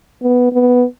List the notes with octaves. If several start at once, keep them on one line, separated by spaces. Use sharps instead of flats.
B3
B3